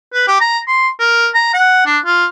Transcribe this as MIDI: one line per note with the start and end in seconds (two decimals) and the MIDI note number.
0.13 0.27 71
0.28 0.39 67
0.41 0.59 82
0.67 0.88 84
1.00 1.28 70
1.34 1.51 82
1.54 1.84 78
1.86 1.98 62
2.06 2.25 65